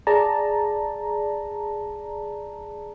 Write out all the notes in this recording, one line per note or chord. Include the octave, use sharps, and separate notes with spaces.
G#4 D5 A5 A#5